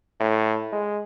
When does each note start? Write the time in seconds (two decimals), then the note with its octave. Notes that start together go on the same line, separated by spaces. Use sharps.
0.20 A2
0.72 G#3